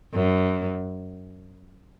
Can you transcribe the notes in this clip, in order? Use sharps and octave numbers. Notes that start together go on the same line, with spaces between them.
F#2